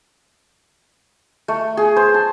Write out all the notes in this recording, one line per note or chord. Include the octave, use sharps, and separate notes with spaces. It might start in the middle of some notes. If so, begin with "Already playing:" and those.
A3
G#4
C5
A5